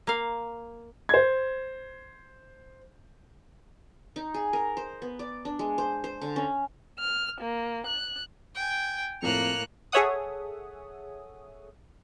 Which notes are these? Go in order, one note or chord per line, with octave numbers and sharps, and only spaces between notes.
A#3 F5
C5 G#6
D#4
G#4
A#4
C5
B3
D5
D4
G#3
C5
C5
D3
C#4
F6
A#3
F#6
G5 G#5
F2 A2 A#3 F#6 C#7 F7
G#4 A4 C#5 E5 F#5 D#6